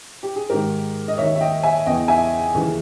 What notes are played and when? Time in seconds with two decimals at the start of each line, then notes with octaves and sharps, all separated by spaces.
0.23 G4
0.36 G#4
0.50 G#2 D#3 G4 A#4
1.08 D#5
1.18 D#2 D#3 C#5 E5
1.35 E5
1.41 D#5 G5
1.63 E5 G#5
1.86 E2 C#3 E3 D#5 G5
2.08 E5 G#5
2.54 D#2 C#3 E3